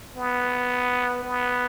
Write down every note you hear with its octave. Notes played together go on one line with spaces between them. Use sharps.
B3
B3